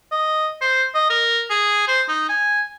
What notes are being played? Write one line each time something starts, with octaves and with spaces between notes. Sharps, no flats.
D#5
C5
D#5
A#4
G#4
C5
D#4
G#5